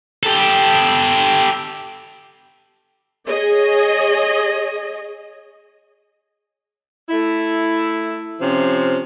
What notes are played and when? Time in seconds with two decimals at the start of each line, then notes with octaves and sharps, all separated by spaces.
0.23 G4 A4
3.27 G#4 C#5 D#5
7.09 A3 E4
8.41 C3 F3 C#4